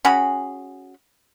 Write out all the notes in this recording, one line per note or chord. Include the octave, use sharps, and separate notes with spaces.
C#4 F#4 G#4 B5